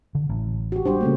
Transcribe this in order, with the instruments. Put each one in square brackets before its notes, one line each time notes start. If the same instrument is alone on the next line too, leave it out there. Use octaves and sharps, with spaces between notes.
[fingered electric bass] D3
A1
[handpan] F#4 G4
[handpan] G3 G4 C5 [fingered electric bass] D4
[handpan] C#3 A3 A#3